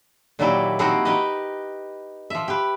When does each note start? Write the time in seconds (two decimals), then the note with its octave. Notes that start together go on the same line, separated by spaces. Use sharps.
0.39 A#2 D#3 F#3 A#3 E4 G4
0.79 F3 C4 D#4 E4 F#4 G4
1.05 D#4 G4 B4 D#5
2.30 F3 E5
2.48 G4 B4